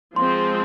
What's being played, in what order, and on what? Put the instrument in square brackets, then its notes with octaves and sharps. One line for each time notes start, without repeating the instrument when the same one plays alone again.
[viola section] F3 G#3 C4 [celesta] C6